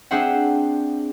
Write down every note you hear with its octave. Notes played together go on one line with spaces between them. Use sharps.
C4 D4 G#4 C5 E5 F#5